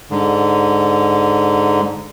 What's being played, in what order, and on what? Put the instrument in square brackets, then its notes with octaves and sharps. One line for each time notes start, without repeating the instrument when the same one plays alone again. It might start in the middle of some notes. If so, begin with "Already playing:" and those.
[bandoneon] G#2 D3